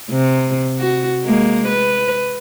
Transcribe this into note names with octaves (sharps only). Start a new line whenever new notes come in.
C3
F#4
G#3 A#3
B4